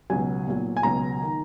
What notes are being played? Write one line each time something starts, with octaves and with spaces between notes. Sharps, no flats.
C#2 B2 F#3 G#5
B1 A#2 F#3
G#5
C#2 B2 F#3 A#5
D#3